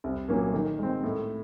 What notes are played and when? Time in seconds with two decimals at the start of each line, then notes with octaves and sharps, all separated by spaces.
0.04 C2
0.28 A#2 F#3 A#3 C#4
0.54 D#3
0.79 G#3 C4
1.04 A2